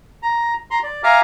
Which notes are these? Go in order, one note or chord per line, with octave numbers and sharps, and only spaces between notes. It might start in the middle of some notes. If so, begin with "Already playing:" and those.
A#5
A#5 C6
D5
E5 F5 G#5 A#5 D6 F6